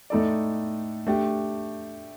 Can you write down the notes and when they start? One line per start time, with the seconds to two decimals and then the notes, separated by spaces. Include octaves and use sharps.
0.10 A2 A3 D#4 A4 D5
1.07 A3 D4 G4